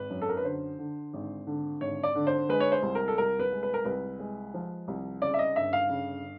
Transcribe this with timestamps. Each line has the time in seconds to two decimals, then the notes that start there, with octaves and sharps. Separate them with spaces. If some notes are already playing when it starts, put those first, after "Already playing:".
Already playing: G#1 B4
0.10 F#2
0.22 A4
0.29 A#4
0.37 B4
0.44 D3 C5
0.79 D3
1.14 G#1
1.47 D3
1.81 G#1 C#5
2.03 D5
2.16 D3
2.27 C5
2.49 G#3 B4
2.60 C#5
2.72 C5
2.83 C2
2.95 A#4
3.08 A4
3.18 C2 A#4
3.39 B4
3.52 G#3
3.63 B4
3.74 A#4
3.85 C2 B4
4.19 G#3
4.54 F3
4.88 C2
5.22 C#3 D5
5.34 E5
5.39 D#5
5.56 G1 E5
5.73 F5
5.90 C#3